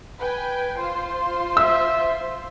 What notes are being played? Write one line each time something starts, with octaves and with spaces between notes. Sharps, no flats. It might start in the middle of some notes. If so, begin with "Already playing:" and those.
B4 G5 G#5
F4 C5 C6
E5 E6